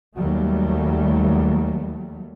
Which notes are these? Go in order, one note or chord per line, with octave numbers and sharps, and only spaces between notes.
D#2 F#3 G3 A3